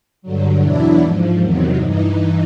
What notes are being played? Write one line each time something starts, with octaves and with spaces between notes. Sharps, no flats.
G2 D3 F#3
E2 B2 F#3 D4 E4
G#2 F3
E2 C3 D#3 F#3
G2 E3 D#4